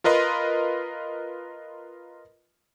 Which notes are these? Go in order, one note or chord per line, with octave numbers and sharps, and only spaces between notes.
F4 A#4 B4 D#5 C6